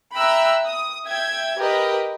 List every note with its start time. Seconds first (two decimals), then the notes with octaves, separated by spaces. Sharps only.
0.16 E5 G5 A#5 B5 E6 F#6
0.64 D#6
1.07 E5 G5 G#6
1.58 G4 A#4 B4 D#5